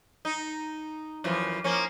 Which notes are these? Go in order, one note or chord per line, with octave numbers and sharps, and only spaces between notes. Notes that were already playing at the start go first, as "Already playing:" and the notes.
D#4
F#2 E3 F3
F3 A#3 C#4